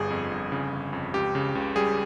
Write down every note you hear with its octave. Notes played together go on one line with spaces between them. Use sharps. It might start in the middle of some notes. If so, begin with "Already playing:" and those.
Already playing: G1 G2 G#4
F2
G1
C#3
G1
F2
C#2 G4
C#3
C#2
G3 G#4